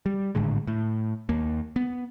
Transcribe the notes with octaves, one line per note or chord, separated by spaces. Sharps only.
G3
G#1 A2 D3 G#3
A2
D#2 A#3
B3